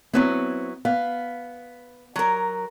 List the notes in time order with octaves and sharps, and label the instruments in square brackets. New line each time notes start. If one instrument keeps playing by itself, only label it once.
[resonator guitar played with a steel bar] F#3 B3 E4 [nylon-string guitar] C4 C#5
[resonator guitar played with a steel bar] B3 [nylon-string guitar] F5
[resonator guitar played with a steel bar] F#3 A#4